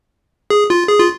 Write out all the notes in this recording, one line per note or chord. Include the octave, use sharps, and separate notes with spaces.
G#4
F4
G#4
F4